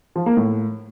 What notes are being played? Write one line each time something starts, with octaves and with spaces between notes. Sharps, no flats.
F3
A#3
A2